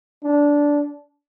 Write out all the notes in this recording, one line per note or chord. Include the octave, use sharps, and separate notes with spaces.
D4